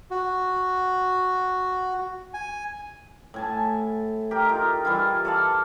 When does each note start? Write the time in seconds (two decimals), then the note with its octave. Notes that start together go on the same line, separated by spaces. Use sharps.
0.11 F#4
2.34 G#5
3.34 A2 G#5 A5
4.31 G4 A#4
4.45 D#4 F4
4.85 E3 G3 E4 F4
5.25 A4 D5 F5